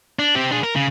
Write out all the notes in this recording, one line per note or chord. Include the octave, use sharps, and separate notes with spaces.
D4
C4 G4
D4 G#4
A#4
C#3